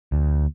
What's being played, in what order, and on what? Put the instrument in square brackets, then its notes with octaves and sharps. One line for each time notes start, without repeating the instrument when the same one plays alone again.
[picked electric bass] D2